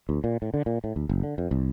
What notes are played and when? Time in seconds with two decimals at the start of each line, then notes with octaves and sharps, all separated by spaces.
0.09 D2
0.24 A#2
0.42 A2
0.54 D3
0.66 A#2
0.84 A2
0.96 D2
1.09 F#1
1.23 D3
1.38 F2
1.51 C2